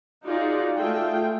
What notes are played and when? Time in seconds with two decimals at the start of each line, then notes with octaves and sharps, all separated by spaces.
0.23 D#4 F4 F#4 G#4 D5
0.77 A3 F4 G#4 G5